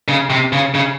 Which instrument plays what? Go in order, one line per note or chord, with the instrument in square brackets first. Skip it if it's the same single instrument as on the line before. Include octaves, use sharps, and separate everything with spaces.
[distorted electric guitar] C#3
C3
C#3
C#3